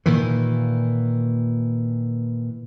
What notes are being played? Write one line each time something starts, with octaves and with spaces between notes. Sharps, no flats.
A#2 D#3 E3